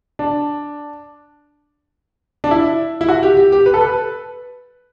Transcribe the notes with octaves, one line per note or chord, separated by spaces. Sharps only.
D4
D4
E4
E4
F#4
G4
G4
G4
B4
A4
B4